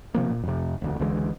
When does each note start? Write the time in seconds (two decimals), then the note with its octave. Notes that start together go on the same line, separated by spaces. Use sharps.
0.14 C3 F3 A#3
0.30 A#2
0.43 F2 C3
0.82 E1 D2
0.99 C#2 D3 E3 G#3